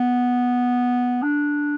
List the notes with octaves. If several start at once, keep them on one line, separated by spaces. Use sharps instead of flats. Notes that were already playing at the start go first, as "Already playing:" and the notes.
Already playing: B3
D4